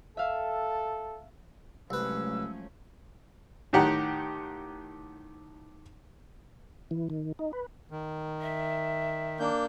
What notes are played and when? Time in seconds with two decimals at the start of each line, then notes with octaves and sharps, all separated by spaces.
0.17 A4 E5 F5
1.90 C2 F3 F#3 G#3 A3 C#4 B4 E6
3.73 A2 D#3 G4 F#5 A#5
6.91 E3
7.10 D#3
7.39 D#4
7.53 B4
7.91 D#3
8.41 E5
9.40 A#3 D4 G6